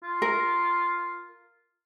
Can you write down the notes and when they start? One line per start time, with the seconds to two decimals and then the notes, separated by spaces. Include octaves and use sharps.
0.03 F4
0.22 A#4